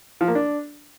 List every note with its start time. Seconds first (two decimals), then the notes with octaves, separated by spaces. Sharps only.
0.21 F3
0.28 A#3
0.35 D4